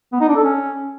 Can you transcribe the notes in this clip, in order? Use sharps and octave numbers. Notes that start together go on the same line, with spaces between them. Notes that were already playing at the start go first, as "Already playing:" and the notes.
B3
D#4
D4
A4
C#4